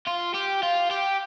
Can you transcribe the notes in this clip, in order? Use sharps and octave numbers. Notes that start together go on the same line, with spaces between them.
F4
G4
F4
G4